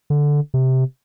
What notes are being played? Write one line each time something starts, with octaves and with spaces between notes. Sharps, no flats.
D3
C3